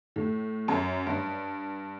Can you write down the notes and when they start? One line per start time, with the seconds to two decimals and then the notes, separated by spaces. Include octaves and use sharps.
0.16 A2
0.68 F#2
1.07 G2